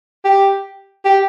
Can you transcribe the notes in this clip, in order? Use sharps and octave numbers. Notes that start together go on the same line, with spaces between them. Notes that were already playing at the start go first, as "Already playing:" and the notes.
G4
G4